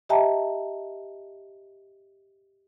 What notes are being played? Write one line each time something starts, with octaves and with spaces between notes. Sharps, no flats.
G4 D#5 E5 G5 A5 A#5